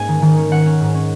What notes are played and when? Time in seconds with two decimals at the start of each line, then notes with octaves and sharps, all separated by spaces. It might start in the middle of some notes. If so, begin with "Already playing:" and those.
Already playing: G#2 A#3 C#4 G#5
0.08 D#3
0.22 D#3
0.37 C#4
0.52 C#4 F#5
0.66 C#4
0.80 G#2
0.95 C#4